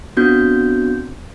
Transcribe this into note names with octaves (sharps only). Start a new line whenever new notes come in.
B3 C4 D4 F#4 G6